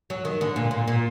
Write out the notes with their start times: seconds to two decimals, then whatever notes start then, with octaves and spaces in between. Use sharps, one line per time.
0.10 F#3
0.25 D#3
0.41 D3
0.56 A#2
0.71 A#2
0.88 A#2